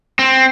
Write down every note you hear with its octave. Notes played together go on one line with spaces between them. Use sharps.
C4